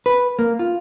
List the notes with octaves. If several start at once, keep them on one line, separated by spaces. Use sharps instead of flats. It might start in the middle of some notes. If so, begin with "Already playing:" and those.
B4
A#3
F4